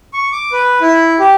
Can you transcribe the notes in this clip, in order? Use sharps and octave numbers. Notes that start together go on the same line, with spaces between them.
C#6
D6
B4
E4
G4